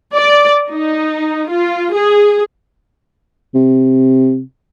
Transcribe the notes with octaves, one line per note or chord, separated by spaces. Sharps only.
D5
D#4
F4
G#4
C3